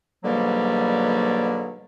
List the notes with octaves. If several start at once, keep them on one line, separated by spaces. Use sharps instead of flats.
G#2 B2 D3 F#3 G3 A#3